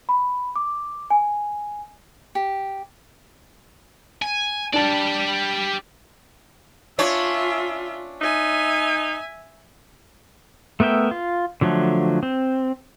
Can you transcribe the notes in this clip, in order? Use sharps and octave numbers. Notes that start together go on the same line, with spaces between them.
B5
D6
G#5
G4
G#5
D4 G4 D5 A5
C#4 D4 F4 C#5 E5
D#4 E5 G#5
A3 B3 A#4 E5 G5
F4
D3 F3 F#3 A3
C4